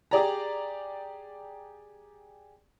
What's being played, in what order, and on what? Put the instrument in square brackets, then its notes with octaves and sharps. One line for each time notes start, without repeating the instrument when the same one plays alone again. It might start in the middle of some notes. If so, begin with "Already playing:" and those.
[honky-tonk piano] G4 G#4 D5 A#5